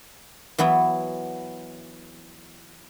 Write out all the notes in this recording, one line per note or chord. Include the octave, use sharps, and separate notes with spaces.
E3 F#3 B3 E4